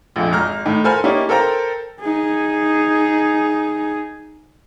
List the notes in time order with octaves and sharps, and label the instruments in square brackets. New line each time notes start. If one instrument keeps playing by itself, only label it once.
[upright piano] A#1 F2
G#1 A#5 F6
A2 D#3
A4 A#4 C5 G#5 B5 F6
A#3 C#4 D#4 E4 G4 D5
A4 A#4 C5 G5 A#5
[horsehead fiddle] D#4 G#4